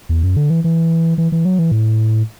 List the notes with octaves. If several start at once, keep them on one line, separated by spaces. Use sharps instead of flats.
E2
F#2
D3
E3
E3
E3
E3
F#3
E3
A2